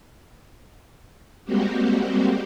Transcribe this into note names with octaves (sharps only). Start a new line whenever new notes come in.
G3 G#3 A#3 C4 F#4 G4